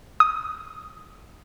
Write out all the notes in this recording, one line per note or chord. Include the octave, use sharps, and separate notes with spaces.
D#6